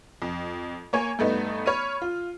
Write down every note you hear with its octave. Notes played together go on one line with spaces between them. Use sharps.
F2
A#3 C#5 G#5
G2 A3 B3 D#4
C#5 B5 F6 D#7
F4